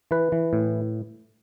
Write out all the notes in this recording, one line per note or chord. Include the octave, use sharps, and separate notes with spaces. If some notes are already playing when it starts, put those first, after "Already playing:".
E3 B4
E3
A2